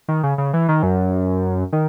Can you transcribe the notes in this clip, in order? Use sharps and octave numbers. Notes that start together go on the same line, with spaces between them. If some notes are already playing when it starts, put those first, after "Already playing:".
D#3
C#3
C#3
E3
D#3
F#2
D#3